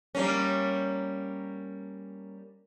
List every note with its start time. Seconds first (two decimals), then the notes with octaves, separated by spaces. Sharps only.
0.15 G3 A#3 C#4